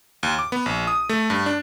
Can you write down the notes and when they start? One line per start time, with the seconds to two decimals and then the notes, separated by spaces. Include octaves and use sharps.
0.23 D#2
0.39 D6
0.52 B3
0.66 A#1
0.87 D#6
1.09 A3
1.30 G2
1.46 D4